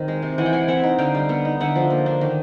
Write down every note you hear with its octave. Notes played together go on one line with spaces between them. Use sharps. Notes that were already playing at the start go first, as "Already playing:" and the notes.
Already playing: D#3 C4
G#3
C3
E3 F#5 G#5
G5
G#3 F#5 G#5
C4 E5 F#5
D#4
D3 F5 G5
G3
B3
D#4
D3 E5 F#5
F3
A#3
D4
D#3